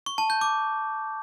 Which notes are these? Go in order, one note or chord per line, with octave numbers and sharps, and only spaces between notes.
C#6
A5
G6
D6